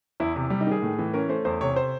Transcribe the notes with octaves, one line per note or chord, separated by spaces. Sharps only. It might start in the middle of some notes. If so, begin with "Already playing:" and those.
E2 E4
C3
G3
D#4
D#3 G#4
A2
E3
C#4 A#4
A3 C5
E2 C5
C3 C#5
C5